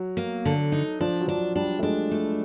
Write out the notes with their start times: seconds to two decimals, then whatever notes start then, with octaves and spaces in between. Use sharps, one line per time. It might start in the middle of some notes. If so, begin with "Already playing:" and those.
Already playing: F#3
0.17 A#3
0.45 D3
0.72 D#4
1.01 F3 D4
1.21 F#3
1.28 F3 D4
1.55 G3 D4
1.79 A3
1.83 G#3 D4
2.12 A3